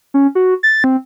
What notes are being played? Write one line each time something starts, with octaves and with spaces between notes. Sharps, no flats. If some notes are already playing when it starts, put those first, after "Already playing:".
C#4
F#4
A6
C4